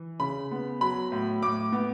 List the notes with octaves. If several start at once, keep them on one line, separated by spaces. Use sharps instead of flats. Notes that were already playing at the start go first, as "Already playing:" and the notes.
Already playing: E3
C#3 B5
B3
F#3 B5
A2
A2 D6
B3